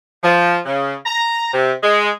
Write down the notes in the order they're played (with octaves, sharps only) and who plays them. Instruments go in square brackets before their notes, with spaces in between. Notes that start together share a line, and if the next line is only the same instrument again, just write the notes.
[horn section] F3
C#3
A#5
C3
G#3